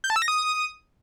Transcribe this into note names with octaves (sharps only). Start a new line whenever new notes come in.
G6
A5
E6
A#6
D#6